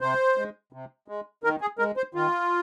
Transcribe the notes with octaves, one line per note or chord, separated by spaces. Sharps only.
C3 C5
G#3
C3
G#3
D#3 A#4
G#4
G#3 A#4
C5
D#3 F4